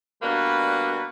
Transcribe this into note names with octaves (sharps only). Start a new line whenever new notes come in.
B2 G3 A#3 D4 F#4 B4